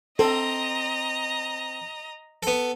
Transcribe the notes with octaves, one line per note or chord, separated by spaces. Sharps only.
C4 A4 D#5 A#5
B3 A4